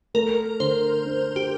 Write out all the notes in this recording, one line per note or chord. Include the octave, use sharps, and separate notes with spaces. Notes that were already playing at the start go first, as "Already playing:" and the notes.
A3 A#4
D3 C5
D4
G4